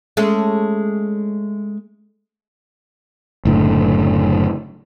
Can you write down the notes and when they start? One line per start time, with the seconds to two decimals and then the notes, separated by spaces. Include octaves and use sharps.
0.17 G#3 A3 C#4
3.45 F#1 A2 D3